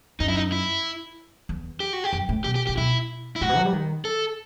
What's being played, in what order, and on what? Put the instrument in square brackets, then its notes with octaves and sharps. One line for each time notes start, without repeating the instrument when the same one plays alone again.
[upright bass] F#2 [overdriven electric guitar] D#4
[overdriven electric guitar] E4
D#4
E4
[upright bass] E2
[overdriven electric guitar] G4
F#4
G4
[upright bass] F#2
A2
[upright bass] B2 [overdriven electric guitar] G4
[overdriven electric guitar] G4
[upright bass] C3 [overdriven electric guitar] G4
[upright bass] B2 [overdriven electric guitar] E4
[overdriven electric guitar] E4
[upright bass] A2 [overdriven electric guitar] F#4
[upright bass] B2
F#3
G3
D#3
[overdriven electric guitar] A4